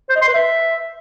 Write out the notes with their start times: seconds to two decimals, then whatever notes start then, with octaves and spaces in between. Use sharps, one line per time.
0.09 C5
0.16 D#5
0.22 C6
0.28 B4
0.34 E5